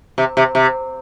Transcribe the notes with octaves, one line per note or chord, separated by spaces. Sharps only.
C3
C3
C3